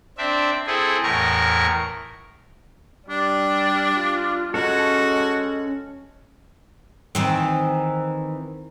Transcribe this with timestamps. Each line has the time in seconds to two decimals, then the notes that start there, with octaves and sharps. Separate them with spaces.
0.18 C4 D4 E5
0.67 C4 E4 G#4 A4
1.03 E2 A2 A#4 C#6
3.09 G3 D4
3.97 F4
4.54 G#3 C#4 F#4 A4
7.15 D#3 E3 C4